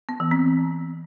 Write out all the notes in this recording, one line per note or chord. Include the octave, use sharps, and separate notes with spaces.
B3
E3
C4